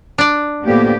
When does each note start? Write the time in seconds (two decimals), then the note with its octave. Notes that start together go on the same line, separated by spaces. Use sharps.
0.18 D4 D5
0.66 A2 D3 F3 A#3 B3 G4